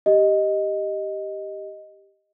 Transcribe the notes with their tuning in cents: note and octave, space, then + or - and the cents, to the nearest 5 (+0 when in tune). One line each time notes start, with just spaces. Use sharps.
G4 +0 D#5 +0